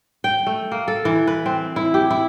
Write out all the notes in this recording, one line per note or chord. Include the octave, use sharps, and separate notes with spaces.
G5
A3
A#3
A4
E3
B4
C4
E4
G4
E4